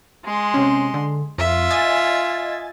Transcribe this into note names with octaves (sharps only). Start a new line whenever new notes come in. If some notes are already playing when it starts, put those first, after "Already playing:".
G#3 C6
C3 C#4
D3
F2 F4 E5
D#5 G#5 A6